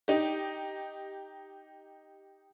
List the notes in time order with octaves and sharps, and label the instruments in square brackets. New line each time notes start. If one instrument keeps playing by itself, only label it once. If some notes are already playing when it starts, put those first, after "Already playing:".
[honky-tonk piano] D#4 G4